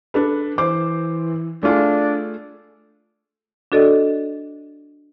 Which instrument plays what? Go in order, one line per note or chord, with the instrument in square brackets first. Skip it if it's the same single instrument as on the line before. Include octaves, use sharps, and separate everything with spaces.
[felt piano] D4 A4 B4
[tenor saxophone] E3 [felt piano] C5 D6
[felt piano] A3 F4 G#4 [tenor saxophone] D4
[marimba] D4 F#4 A4 D5 D#5